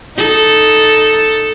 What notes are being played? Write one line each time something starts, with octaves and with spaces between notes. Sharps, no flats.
D#4 A4